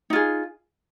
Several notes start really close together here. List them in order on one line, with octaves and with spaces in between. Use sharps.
D#4 F4 G#4